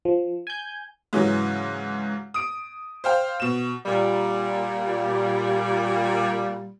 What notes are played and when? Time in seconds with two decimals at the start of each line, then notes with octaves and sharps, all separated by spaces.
0.05 F3
0.47 G#5 G6
1.13 G#2 C#3 E3 F#3
2.34 D#6 D7
3.04 C5 F5 G5
3.40 B2 E7
3.86 A#2 G3